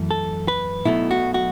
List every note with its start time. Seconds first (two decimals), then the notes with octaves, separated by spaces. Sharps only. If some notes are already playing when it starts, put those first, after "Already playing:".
Already playing: F#2 E3 A3
0.11 A4
0.48 B4
0.85 B1 B2 F#3 A3 E4
1.11 F#4
1.34 F#4